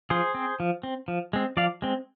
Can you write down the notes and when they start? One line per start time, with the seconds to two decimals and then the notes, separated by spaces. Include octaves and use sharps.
0.10 F3 G#4 C5
0.35 C4
0.60 F3
0.83 C4
1.08 F3
1.33 G#3 C4
1.57 F3 D5 F5
1.82 G#3 C4